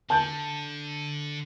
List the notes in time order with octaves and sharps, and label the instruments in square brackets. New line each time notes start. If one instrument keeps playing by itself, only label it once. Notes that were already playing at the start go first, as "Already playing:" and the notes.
[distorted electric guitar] D3 [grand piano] A5 G6